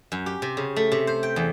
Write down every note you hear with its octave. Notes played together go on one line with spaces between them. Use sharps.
F#2
G4
C3
C#3
A3
C3
C5
G5
E2